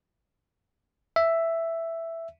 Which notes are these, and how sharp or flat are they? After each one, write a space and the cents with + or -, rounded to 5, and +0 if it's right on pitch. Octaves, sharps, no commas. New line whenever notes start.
E5 +5